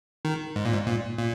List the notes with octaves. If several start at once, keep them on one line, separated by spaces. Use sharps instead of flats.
D#3
G#2
A#2
G#2
A#2
A#2